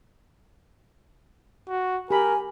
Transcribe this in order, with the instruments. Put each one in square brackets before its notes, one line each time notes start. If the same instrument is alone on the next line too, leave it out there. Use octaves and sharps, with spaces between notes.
[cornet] F#4
[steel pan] G4 B5 [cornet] A#4 [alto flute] G#5